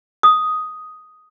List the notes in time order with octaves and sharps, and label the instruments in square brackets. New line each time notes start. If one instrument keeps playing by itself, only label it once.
[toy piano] D#6